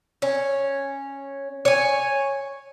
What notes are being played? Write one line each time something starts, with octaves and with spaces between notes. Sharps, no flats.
C#4
C#5 G#5